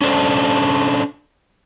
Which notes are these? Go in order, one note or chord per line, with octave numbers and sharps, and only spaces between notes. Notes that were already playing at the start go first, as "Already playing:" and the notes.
C#4 D4 A4 C5